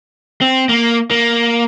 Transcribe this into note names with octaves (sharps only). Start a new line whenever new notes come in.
C4
A#3
A#3